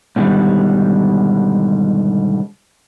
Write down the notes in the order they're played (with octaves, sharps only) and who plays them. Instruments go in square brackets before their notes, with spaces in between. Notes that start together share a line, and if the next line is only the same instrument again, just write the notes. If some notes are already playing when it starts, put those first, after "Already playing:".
[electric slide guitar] G#2 B2 D3 D#3 G3